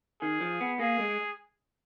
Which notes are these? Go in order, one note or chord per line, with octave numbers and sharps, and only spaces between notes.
D#3 G#4
F3
B3
A#3 G#4
G#3